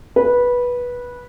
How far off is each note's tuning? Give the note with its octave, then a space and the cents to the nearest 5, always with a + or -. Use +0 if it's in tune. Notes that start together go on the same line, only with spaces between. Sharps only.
B4 -15